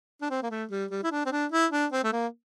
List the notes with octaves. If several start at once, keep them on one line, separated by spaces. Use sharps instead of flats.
D4
C4
A#3
A3
G3
G3
E4
D4
C4
D4
E4
D4
C4
A3
A#3